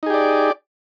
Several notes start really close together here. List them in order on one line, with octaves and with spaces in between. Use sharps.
D#4 G#4 G4 D5